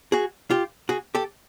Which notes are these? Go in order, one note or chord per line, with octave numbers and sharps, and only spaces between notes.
F#4 G#4
F4 G4
F#4 G#4
G4 A4